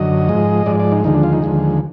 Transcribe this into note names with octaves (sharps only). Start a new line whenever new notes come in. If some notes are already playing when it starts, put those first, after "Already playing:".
Already playing: F#2 D3 F#3 D#5
G#2 F3 G#3
G#2 F3 G#3 D5
D5
D#4
D#2 D3 F3 G#3 D#4
D4
F4
D#4
D#2 D3 F3 G#3